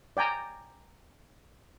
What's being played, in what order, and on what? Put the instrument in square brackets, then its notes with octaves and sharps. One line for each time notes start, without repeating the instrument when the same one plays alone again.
[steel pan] D5 G5 G#5 A#5